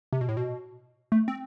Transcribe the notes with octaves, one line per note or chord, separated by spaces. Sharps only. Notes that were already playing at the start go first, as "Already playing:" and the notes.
C3
B2
A2
B2
A3
C4